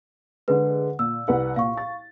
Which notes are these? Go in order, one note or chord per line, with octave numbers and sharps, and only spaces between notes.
D3 G#3 B4
A#2 E6
C2 B4 F#5
A#2 F5 C#6
A6